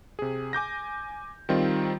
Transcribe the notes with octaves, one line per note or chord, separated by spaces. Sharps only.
C3 G#4
G#5 D6 G6 A#6
D#3 G3 C4 D#4 F4